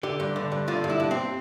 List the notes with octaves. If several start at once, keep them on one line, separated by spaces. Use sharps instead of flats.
D3 G4
G2
D3
G2
D3 F4
G2
E4
G2
C4